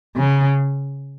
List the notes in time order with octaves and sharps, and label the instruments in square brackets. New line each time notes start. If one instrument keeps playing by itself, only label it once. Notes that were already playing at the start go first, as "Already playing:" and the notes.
[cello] C#3